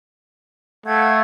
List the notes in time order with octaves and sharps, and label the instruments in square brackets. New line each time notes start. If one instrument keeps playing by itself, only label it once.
[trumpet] A3 [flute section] F5 F#5 G#6